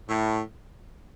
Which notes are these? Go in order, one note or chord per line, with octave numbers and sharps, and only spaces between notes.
A2